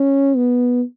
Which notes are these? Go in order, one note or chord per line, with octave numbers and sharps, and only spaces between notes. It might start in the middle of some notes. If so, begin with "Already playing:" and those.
Already playing: C#4
B3